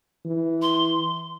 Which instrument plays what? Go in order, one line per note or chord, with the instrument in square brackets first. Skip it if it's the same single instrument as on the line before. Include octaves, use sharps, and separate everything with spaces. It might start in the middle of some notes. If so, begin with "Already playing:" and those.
[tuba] E3
[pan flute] C6